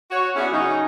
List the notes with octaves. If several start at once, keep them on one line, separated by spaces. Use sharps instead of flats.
F#4 C#5
B3 C#4 D4 E4 F#4 G#4
C#3 F#3 C#4 D#4